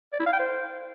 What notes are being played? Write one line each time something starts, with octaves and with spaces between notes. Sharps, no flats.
D5
E4
F5
G5
C5